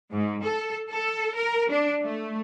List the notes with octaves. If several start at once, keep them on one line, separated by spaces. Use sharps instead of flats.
G#2
A4
A4
A#4
D4
A3